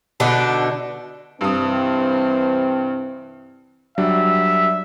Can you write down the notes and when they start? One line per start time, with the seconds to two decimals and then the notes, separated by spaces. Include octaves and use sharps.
0.20 B2 D3 D4 D#4
1.41 G2 C3 E3 C4 D#6
3.98 F#3 G3 D4 E5